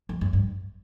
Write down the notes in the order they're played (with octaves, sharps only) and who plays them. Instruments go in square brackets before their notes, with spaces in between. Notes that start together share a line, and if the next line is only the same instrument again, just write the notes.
[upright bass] F2
F#2
G2